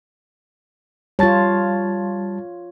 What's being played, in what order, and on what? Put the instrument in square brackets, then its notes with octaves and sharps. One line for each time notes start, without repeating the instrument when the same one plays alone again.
[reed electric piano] G3 A5 A6 [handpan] F4 C#5